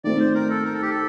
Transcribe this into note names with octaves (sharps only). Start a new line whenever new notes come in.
D#3 A3 C4 D5
C5
A#4
A4
A#4
A4
G4
A4